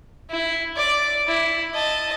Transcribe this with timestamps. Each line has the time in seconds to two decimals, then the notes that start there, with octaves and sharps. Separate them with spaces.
0.30 E4
0.76 D5
1.27 E4
1.74 D#5 A5